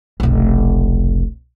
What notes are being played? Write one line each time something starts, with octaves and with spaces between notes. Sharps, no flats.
F1 B1